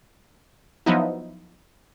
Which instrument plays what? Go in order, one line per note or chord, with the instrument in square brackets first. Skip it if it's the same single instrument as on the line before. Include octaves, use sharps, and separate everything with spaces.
[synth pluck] F3 F#3 B3 D#4 E4